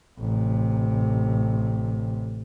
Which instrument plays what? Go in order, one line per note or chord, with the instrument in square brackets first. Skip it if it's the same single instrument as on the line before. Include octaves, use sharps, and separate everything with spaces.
[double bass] A1 C3